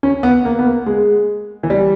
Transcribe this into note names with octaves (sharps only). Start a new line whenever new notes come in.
C#4
B3
A#3
B3
A#3
G#3
E3
G3